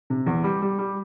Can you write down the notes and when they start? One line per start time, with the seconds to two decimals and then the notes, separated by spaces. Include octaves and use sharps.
0.10 C3
0.26 E2
0.44 G3
0.62 G3
0.79 G3